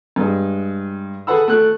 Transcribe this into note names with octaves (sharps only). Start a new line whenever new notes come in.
G2 G#3
G#4 A4 B4 F#5 B5 E6
A3 F#6